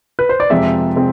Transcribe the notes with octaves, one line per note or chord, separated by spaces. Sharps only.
B4
C5
D5
F2 C3 F3 G#3 C4 E5
C3 G#3 C4